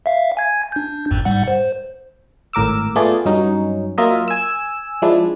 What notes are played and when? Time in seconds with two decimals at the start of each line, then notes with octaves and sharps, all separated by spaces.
0.06 E5 F5
0.37 G#5 G#6
0.72 D4 G6
1.11 G#1 F2 G#2
1.25 G#2 G3 F#5
1.48 C5
2.53 G#1 A2 A#4 D6 E6
2.96 A3 B3 F4 G#4 D5
3.25 G2 F#3 C#4 D#4
3.98 F#3 A#3 F4 A#4 D#5 E5
4.28 G#5 E6
5.02 F3 G#3 D4 E4